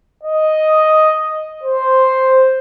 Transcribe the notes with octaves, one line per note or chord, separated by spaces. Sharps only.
D#5
C5